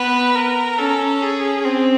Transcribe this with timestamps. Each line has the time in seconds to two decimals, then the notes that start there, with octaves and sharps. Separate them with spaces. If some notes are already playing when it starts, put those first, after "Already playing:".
Already playing: B3 B4
0.35 A#4
0.79 C#4 A4
1.22 G#4
1.65 C4